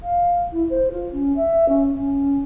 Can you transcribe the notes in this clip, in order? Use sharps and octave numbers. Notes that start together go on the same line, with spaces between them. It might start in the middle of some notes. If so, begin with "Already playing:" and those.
F5
E4
C5
F4
C#4
E5
C#4
C#4